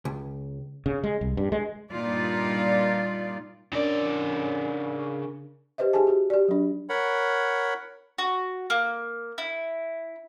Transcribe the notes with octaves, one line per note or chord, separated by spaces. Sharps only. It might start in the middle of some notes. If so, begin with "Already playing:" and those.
C#2
C#3
G#3
C2
G2
G#3
G2 A#2 D#4 F4 D5
C#3 C#4 D4 A#4 D5
G4 B4 C5 D#5 E5
D#4 G4 G#4 G#5 A5
F#4 G4
G4 D5
F#3 D4
A#4 C#5 F#5 B5
F#4
A#3
E4